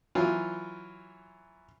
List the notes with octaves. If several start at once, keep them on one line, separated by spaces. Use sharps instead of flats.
E3 F#3 F4